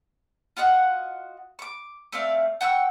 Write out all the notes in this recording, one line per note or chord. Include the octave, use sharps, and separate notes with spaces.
F4 F#4 D#5 F#5
C#6 D6
A3 C4 D5 F5
F#5 G5 C#6 E6